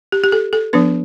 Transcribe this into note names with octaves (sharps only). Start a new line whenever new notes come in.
G4
G4
A4
A4
F3 B3 D4 B4